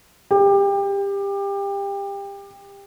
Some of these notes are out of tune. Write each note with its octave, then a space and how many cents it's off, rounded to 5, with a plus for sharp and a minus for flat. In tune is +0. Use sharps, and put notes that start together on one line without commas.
G4 +25